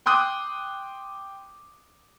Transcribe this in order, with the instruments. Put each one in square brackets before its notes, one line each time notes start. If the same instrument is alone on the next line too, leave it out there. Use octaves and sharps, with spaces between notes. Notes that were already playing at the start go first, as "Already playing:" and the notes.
[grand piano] G5 C6 D6 D#6 F#6